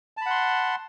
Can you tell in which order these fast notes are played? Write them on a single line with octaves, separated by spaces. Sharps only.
A5 B5 F#5 C6